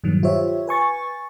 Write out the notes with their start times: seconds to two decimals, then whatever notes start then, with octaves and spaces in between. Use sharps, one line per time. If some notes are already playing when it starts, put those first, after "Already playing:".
0.04 G2 A#2 D#3 F#3
0.23 F4 G4 C5 C#5 E5
0.67 B4 G#5 C#6 A6